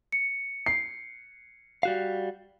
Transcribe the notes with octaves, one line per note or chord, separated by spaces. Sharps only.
C#7
C7
G3 F#4 F5